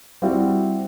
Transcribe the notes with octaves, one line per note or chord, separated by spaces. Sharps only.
G3 C4 E4 F#4 G4 C5